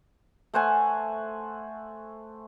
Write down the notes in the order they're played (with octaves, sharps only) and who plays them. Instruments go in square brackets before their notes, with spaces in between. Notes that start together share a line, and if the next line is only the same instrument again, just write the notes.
[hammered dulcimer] A3 C5 F#5 G#5